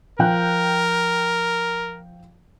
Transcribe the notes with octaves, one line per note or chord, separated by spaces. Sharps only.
F3 A#4 G5 F#6